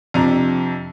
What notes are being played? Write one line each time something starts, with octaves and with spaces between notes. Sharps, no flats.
F2 C3 D4 A#5